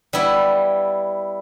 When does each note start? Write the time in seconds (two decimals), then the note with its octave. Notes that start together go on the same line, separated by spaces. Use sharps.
0.13 G3 B3 E4